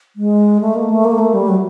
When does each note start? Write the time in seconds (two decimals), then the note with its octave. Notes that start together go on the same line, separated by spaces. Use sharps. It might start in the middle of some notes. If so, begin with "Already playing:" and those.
0.16 G#3
0.61 A3
0.75 A#3
0.90 A3
1.05 A#3
1.19 A3
1.34 G3
1.48 F#3